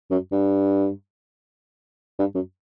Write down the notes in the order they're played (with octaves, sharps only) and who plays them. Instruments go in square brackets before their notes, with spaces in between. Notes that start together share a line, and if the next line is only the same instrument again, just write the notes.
[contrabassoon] F#2
G2
G2
F#2